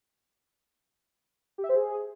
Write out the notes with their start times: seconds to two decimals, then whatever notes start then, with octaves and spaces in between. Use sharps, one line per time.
1.58 G4
1.64 E5
1.69 C5
1.75 G#4